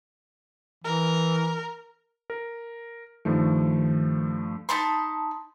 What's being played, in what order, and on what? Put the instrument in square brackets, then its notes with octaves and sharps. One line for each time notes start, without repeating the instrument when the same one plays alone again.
[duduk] E3 [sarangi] A#4
[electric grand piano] A#4
[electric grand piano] G2 F3 A3 [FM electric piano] D#3
[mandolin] D#4 A5 B5 C6